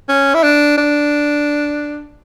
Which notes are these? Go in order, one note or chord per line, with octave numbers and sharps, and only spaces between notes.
C#4
E4
D4
D4